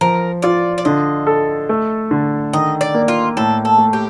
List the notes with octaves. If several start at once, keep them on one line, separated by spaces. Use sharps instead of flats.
F3 A#4
F4 D5
D5
D3 D#5
A4
A3
D3
D#3 D#5
D5
A#3
F4
A2 A4
A4
A3
G4